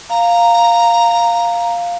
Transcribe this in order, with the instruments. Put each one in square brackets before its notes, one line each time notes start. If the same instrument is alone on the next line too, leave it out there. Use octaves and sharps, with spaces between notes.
[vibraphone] F5 [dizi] A#5